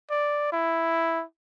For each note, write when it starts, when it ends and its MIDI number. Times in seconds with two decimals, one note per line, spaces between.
0.10 0.48 74
0.52 1.24 64